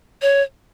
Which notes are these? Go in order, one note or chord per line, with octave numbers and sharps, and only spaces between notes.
C#5